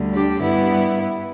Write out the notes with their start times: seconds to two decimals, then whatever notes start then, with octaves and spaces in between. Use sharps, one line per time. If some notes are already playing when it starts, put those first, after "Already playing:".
Already playing: D2 D3 G3
0.14 D4 G4
0.42 G2 G3 B3 E4